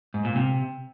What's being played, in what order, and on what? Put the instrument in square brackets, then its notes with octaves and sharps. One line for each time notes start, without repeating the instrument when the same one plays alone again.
[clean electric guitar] G#2
A#2
C3